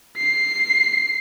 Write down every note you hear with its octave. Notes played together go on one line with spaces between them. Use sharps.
C7